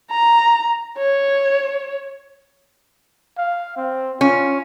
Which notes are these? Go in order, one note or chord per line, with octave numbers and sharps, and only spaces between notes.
A#5
C#5
F5
C4
C#4 F4